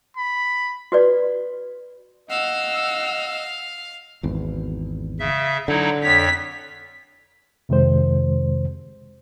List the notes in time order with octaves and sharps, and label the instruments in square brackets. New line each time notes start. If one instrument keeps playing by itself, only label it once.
[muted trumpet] B5
[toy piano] F#4 B4 D5
[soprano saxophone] D#5 [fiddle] F5 [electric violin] F#5 E6
[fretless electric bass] G#1 E2
[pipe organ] C#3 E5
[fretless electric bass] D3 [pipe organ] F#3 D#4 E4
[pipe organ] F2 C#5 [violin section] B6
[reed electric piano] F2 C3 D#3 G#3 C5